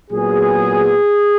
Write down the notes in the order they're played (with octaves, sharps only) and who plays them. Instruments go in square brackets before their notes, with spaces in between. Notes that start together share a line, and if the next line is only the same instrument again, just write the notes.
[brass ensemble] A#2 F#3 B3 G#4